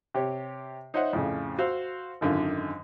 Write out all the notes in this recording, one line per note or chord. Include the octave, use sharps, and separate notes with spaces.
C3 G4 C#5
D#4 C5 C#5 D#5 E5 F#5
F2 A2 C#3
F#4 C5 F5 E6
G#1 F#2 D3 D#3 F4